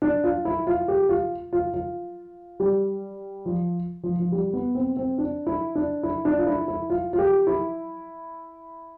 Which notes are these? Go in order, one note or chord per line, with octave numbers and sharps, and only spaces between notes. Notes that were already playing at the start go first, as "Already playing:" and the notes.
D4
F4
E4
F4
G4
F4
F4
F4
G3
F3
F3
F3
G3
B3
C4
C4
D4
E4
D4
E4
D4
F4
E4
E4
F4
F4
G4
E4